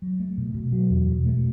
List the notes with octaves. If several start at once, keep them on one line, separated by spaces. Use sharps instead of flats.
F#3
A3
B2
B2
F#3
E2
B2
A3